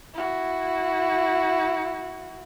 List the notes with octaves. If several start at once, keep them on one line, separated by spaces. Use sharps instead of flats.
E4 F#4